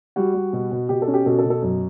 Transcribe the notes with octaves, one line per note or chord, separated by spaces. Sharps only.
G3 F#4
G3
B2
B2
B2 G4
A4
C#4
G4
B2 A4
A4
B2
A4
F#2